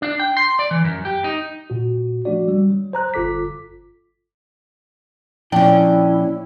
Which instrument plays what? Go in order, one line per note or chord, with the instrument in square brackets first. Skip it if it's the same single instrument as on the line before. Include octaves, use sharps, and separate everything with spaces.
[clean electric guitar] D4
G5
C6
D5
E3
F#2
G4
D#4
[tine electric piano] A#2 F#4
F3 A3 D4 F#4 D5
G3
F#3
C5 A#5 F#6
G1 F4 A4 D6 B6
[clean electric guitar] A#2 F3 G5 [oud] C#4 D4 [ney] E4